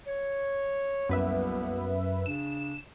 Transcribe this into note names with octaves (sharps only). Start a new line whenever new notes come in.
C#5
C2 F#2 A#3 B3 B4 E5
C#3 D4 E7